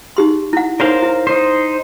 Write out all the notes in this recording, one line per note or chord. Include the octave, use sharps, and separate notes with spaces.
D#4 G4 C6
E4 F#5
D#4 A#4 C5 C#5 F5
E4
D#4 C5